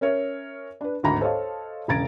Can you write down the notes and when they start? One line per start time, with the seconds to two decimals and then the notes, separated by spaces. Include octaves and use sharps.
0.01 C#4 A#4 C#5 E5
0.81 D4 B4
1.03 G#1 D2 A#5 B5
1.21 A4 C5 C#5 D#5 F5 A5
1.88 E1 C#3 A#5 G#6 A6 D7